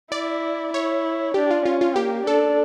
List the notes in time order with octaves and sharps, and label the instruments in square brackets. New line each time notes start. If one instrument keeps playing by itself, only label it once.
[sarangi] E4 [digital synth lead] D5
[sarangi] E4 [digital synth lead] C#5
[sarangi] D4 [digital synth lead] G4
[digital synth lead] F4
[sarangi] C#4 [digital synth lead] F4
[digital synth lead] F4
[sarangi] A#3 [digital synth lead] G4
[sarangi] D4 [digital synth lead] A4